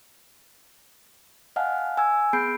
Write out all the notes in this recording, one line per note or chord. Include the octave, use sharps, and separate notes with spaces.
D#5 F5 F#5 G#5 A5 F6
G#5 E6 G#6
B3 G#4 B5 G6 C7 D7